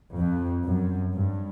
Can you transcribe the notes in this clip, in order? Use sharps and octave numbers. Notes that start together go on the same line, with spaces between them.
F2
F#2
G2